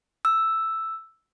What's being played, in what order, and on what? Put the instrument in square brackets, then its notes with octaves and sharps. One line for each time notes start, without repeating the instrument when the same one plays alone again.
[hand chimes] E6